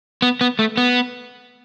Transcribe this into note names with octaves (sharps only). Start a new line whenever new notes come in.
B3
B3
A3
B3